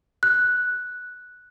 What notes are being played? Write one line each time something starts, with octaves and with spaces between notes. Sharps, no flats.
F#6